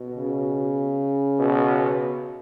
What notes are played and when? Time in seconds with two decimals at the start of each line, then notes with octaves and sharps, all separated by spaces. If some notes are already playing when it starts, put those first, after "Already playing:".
Already playing: B2
0.15 C#3
1.39 B2